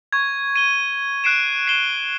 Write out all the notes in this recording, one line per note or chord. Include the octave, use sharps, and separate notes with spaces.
C#6 G#6
D#7 G7
F#6 C7 D7 E7
C7 D#7 E7 G7